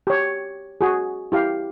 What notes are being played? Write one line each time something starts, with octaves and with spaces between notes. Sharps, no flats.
G4 C#5
F#4 G#4
E4 G4 F5